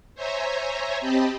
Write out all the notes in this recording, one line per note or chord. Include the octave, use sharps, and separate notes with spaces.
C5 C#5 E5 G#5 A#5
C4 G4 D#5 A5 B5